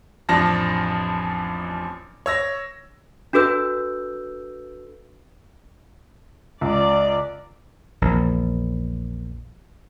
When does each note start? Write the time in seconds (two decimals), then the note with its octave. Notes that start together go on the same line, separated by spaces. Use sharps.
0.29 A1 F2 F3 D4 A5 A#6
2.26 C#5 E6 A#6
3.33 D4 F#4 A4 B4 E6 G6
6.61 C#2 D5
8.02 A#1 E2